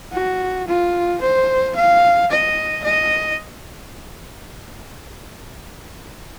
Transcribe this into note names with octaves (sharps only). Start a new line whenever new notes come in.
F#4
F4
C5
F5
D#5
D#5